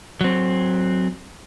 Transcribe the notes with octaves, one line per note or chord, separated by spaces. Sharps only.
F#3 C4